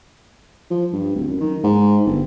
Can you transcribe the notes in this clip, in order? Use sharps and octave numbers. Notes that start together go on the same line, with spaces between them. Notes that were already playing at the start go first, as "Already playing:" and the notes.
F3
G2
D1
F#2
D#3
G#2
G1